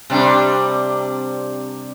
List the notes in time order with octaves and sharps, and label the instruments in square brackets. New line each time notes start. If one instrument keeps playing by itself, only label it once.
[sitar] C3 G3 D4